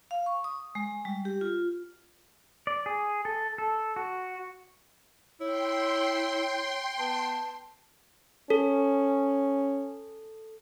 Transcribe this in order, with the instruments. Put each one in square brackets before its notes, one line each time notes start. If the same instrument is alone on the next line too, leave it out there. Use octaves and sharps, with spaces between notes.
[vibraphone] F5
C#6
D#6
G#3
G3
G4
F4
[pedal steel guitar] D5
G#4
A4
A4
F#4
[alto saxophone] E4 [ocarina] C#5 [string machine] G5 C6
[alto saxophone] B3 [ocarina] A5
[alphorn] C#4 [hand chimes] A4